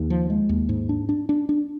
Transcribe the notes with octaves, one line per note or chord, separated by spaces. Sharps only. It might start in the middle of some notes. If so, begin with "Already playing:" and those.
Already playing: D#2
F3
G#3
D#2
G#2
D4
D4
D4
D4